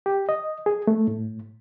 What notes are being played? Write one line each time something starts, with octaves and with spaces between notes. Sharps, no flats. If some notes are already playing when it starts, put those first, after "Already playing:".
G4
D#5
G#4
A3
A2